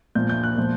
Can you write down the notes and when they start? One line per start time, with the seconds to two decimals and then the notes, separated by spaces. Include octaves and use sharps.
0.15 A#2 F3 G6
0.29 G6
0.44 F#6
0.58 A#2 F3